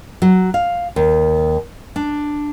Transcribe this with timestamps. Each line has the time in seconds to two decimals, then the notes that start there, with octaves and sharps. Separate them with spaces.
0.22 F#3
0.54 F5
0.96 D#2
1.96 D4